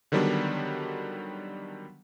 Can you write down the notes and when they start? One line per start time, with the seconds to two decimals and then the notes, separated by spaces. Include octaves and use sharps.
0.12 D3 D#3 F#3 G3 B3 D4